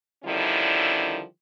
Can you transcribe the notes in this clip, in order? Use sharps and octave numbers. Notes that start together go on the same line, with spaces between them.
D3 D#3 F3 G3 C#4 E4